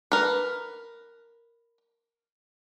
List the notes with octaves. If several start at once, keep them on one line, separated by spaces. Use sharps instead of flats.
A#4 B4